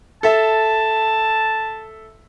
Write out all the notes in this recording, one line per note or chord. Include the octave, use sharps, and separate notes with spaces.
A4 E5 A5